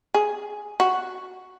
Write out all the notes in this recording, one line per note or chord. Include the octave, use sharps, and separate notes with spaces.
G#4
F#4